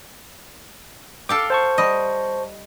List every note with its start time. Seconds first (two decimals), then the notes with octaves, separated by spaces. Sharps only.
1.29 A4 F5 G5 D6
1.50 C5 A5 C#6
1.78 G3 D#5